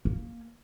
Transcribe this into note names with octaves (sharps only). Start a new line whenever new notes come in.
A#3